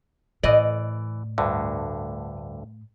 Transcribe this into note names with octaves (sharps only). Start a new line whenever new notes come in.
A2 E3 D5 D#5
D2 G2 D3